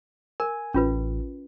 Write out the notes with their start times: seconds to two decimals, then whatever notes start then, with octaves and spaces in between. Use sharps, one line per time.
0.40 A#4 G#5
0.74 A1 C#4 F4 B4